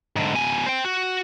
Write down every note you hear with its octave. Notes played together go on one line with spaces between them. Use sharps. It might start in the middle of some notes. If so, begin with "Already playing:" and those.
G#2 D3
B2 G#5
C5 G5
F#4